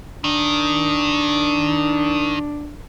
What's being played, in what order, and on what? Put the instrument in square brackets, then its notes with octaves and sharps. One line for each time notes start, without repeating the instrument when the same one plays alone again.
[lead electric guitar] D#3 [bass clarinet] D4